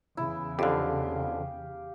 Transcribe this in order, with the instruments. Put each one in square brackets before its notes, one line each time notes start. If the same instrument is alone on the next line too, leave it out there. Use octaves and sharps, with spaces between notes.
[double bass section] E2 C#3 [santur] E4
[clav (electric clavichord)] F2 D3 [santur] G4 F5